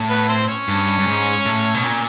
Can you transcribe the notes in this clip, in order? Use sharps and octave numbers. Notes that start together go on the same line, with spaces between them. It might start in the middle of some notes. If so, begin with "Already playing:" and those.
Already playing: A2
B3 B4
C4 C5
C#4 C#5
G2
G2
G#2
A2
B2
A#2